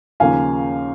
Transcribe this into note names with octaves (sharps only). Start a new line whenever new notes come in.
D#2 C#3 F3 A#3 F5 G#5